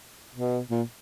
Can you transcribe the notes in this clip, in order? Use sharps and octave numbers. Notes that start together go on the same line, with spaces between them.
B2
A#2